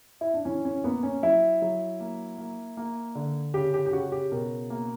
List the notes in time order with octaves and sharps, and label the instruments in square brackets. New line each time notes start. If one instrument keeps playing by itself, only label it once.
[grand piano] E4
D4
[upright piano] E3 [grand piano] C#4
[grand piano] C#4
[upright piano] A#3 [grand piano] B3
[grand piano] C#4
[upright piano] F#3 [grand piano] E4
[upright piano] F#3
A#3
A#3
A#3
D3
[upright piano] C#3 [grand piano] G4
[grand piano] G4
G4
[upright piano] C#3 [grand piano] F#4
[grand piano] G4
[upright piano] B2 [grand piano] A#4
[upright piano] A#3